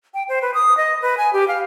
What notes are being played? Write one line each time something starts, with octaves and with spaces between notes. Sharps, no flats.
G5
C5
B4
D#6
D#5
B4
G#5
G4
F5